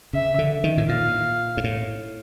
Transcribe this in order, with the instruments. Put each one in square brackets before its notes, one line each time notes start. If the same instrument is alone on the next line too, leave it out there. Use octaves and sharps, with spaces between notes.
[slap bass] C#3 [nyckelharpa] E5
[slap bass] D3
D#3
A2
[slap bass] A#2 [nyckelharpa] F5
[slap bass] G#2
A2